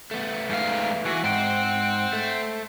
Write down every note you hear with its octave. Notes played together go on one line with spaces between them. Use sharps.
A3 B3
G#2 F5
E3 F#4
G#2 C5 F#5 G5
A3